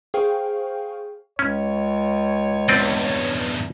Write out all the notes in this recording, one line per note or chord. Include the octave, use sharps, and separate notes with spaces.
G#4 C5 F5 G5 C#6
C#2 C#4 C#5
E2 G2 C4 D5 D#5